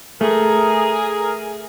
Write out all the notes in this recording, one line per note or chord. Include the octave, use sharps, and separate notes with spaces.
A3 G#4 A#4